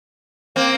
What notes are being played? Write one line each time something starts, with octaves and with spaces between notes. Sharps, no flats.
A#3 C4